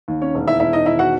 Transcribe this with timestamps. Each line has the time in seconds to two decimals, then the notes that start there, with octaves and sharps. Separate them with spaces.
0.08 D#2
0.22 C#4 C#5
0.35 E1
0.48 E4 E5
0.60 E1 E4 E5
0.73 D#4 D#5
0.86 D#3 E4 E5
0.99 F#4 F#5